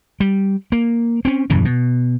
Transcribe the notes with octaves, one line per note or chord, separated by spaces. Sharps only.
G3
A#3
C4 C#4
D#1 F#2 C#3 E3
B2